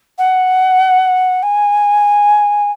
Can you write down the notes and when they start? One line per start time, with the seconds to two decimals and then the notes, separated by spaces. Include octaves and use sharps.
0.18 F#5
1.43 G#5